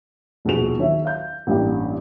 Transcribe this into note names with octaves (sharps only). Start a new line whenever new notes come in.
D#1 B1 F3 F#4 G#4 F7
D#3 F#3 C#5 E5
F5 G6
A1 G2 A#3 G4